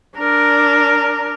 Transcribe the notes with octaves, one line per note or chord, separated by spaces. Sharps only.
D4 A#4